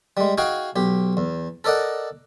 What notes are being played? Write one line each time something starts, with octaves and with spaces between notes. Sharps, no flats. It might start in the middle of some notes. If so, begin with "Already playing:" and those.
G3 G#3
D#4 F#4 G#4 F5 G5
B1 G4
E2
A4 A#4 D5 D#5 F#5